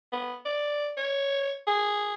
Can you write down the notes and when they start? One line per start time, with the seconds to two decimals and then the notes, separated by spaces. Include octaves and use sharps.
0.12 B3
0.45 D5
0.97 C#5
1.67 G#4